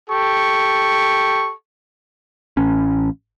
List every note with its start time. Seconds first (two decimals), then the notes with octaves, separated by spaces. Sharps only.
0.10 G4 A4 C#6
2.57 A1 C#4